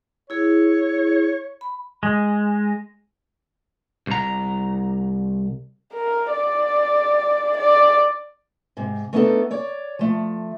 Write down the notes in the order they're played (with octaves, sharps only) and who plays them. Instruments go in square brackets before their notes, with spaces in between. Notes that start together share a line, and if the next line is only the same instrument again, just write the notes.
[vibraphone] E4 G#4 [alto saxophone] C#5
[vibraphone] B5
[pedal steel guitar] G#3
[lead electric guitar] C2 A#5
[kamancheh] A#4
D5
D5
[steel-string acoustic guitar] G#2 C3
A3 B3 D4 D#4 G#4 A4
C#5 D5
F3 A3